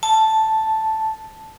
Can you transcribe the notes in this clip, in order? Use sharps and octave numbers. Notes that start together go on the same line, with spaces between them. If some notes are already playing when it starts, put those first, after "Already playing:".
A5